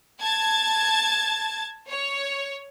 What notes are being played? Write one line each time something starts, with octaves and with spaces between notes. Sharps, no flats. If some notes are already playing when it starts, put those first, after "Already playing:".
A5 G#6 A6
C#5